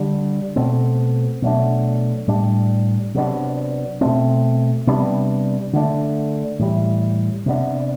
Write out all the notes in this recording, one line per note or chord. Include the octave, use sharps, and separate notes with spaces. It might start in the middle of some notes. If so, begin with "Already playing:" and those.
Already playing: D3 G3 D4
B2 A3 C4
B2 F#3 A3 D4
A2 G3 D4
C3 F#3 B3 D4
B2 A3 C4
C3 G3 B3 D4
D3 A3 D4
A2 E3 G3
C3 G3 B3 D4